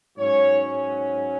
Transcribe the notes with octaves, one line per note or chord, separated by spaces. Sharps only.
G#2 F#3 C#4 C#5